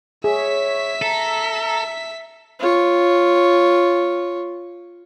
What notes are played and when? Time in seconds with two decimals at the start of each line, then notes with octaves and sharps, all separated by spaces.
0.24 G#4 C#5 E5 B6
1.02 A4 A#5
2.59 F4 C#5